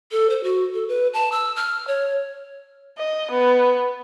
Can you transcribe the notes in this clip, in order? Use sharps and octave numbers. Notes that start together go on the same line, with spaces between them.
A4
C5
F#4
A4
B4
A5
E6
F6
C#5
D#5
B3